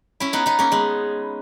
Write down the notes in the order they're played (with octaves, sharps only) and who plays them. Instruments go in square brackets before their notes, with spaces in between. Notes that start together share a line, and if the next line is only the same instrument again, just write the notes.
[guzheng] C#4 E4
B3 D#4
B3 D#4
A#3 C#4
G#3 B3